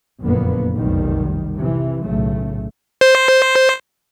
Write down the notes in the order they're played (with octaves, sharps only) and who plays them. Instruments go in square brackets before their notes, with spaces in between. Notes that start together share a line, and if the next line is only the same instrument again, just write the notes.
[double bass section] F#1 F2 A#2 D3 A#3 B3
F1 B1 D#3 G3
C3 E3
B1 A2 C#3 A3
[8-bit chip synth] C5